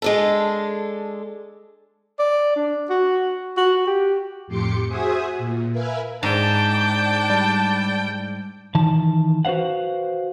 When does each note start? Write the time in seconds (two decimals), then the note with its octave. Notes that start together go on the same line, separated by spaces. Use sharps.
0.02 G#3 D4 A4
2.19 D5
2.56 D4
2.90 F#4
3.57 F#4
3.87 G4
4.47 F2 A2 G4 C6 D6 C#7
4.89 F#4 G#4 C5 E5 G#5 D#6
5.38 A#2
5.72 A#4 B4 E5 F5 G#5
6.23 G#2 D4 D5 G5 A5
7.30 G3
8.75 D#3 E3 A5
9.45 F#4 B4 C5 F5 F#5